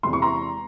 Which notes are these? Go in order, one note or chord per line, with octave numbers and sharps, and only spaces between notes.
E2 C3 E3 G#3 C6
C#6
A#5 C6